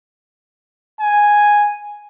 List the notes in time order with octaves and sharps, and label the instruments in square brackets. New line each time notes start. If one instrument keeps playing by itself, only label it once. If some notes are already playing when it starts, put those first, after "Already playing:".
[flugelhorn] G#5